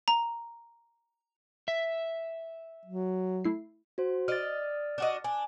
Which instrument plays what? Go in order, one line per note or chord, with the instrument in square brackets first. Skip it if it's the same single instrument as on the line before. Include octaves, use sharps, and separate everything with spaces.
[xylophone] A#5
[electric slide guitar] E5
[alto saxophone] F#3
[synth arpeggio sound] A3 E4 C7
[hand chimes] F#4 C5
[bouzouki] D5 D#5 [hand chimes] F6 A6
[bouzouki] D4 F#4 D#5
[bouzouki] D4 [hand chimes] G#5